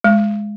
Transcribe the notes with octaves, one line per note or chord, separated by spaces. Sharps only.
G#3